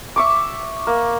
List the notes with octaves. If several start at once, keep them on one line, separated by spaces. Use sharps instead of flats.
E5 C#6 D6
A#3